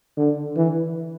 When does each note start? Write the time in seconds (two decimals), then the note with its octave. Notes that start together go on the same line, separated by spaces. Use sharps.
0.18 D3
0.56 E3